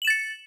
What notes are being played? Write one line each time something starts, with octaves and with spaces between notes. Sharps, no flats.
A6 C#7 E7 F#7